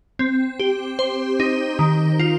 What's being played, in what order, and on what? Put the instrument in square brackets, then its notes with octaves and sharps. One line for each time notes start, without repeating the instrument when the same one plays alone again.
[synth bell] C4
G4
C5
D#4
D#3
F4